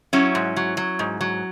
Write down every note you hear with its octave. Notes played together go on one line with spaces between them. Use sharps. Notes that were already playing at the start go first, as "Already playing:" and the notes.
F#3 C#4 E4
G#2
F#3
F#3
G#2
F#3